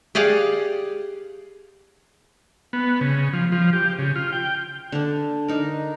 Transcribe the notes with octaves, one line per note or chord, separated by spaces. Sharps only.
G4 G#4 D5 F5 F#5
B3
C#3
F3
F3
G4
C#3
F4
G5
D3 D4
D4 D#4 A#4